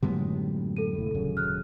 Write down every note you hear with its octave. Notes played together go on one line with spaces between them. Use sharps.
F#2 A2 D3 G3 G#3 B3
A4 D#7
F1 A2
D#1 F#2 C#3
F6 F#6